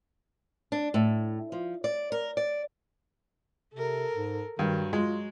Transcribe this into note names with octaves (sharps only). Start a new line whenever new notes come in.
D4
A2
F3
D5
A#4
D5
C3 A4 A#4
G#2
G2 D#3 F#3
G#3 F4